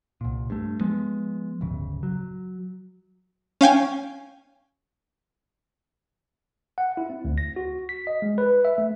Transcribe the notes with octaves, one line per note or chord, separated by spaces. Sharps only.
C2 A#2
G2 A3
F3 G#3 B3
D1 G1 C#3
F#3
C#4 F5 G5 G#5
F#5
E4
C4
D2
A#6
F#4
B6
D#5
G#3
B4
E5
A3